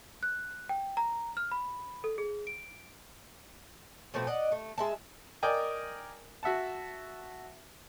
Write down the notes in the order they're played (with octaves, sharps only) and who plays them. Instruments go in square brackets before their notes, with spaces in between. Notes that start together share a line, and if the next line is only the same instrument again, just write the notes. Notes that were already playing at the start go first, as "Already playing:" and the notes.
[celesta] F#6
G5
A#5
F6
B5
A4
G#4
D7
[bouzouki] B2 F3 A3 C4
D5 D#5 F#5
A3
G#3 E5 A5
[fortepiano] A#4 D5 D#5 G5 G#5
F#4 E5 F#5 A5